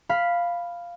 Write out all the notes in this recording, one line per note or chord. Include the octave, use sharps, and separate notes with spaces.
F5 B5 B6